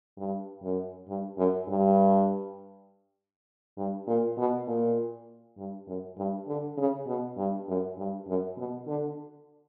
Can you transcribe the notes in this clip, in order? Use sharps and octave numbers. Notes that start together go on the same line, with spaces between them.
G2
F#2
G2
F#2
G2
G2
A#2
B2
A#2
G2
F#2
G2
D3
C#3
B2
G2
F#2
G2
F#2
B2
D3